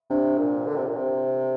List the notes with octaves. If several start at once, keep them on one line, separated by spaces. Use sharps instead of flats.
C3 D4
A#2
D3
C3
A#2
C3